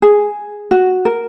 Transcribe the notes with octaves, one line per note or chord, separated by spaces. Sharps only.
G#4
F#4
A#4